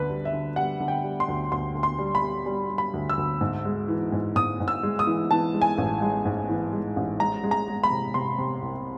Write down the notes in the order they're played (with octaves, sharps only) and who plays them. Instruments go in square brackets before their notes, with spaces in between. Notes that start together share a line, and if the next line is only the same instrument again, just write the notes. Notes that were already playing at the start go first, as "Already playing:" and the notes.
Already playing: [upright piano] D2 D3 B4
G3
E5
D3
G3 F#5
D3
G5
G3
C6
D2
D2 C6
D2
C6
G3
B5
G3
G3
G3
B5
D2
E6
D2
G#2
G#3
E3
G#2
G#2 D#6
G#2
E6
G#3
D#6
E3
E3 A5
G#3
G#5
A1
G#3
G#2
E3
G#3
A1
G#3 A#5
G#3
A#5
G#3
B5
C3
C3 C6
C3
C2